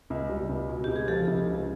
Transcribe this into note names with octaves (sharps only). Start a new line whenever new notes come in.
C#2
G3
C#2
B2
C#2 G4
G#4
F3 G4 A4
C#2
C#3